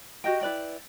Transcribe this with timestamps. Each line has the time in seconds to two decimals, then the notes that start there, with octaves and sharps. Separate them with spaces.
0.24 F#4 G4 D#5 G5
0.41 E4 B4 D5 G5